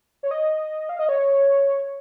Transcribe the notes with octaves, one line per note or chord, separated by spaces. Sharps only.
C#5
D#5
F5
D#5
C#5